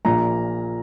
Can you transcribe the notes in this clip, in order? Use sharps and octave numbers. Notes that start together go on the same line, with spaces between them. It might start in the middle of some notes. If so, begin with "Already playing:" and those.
A#1 A#2 A#5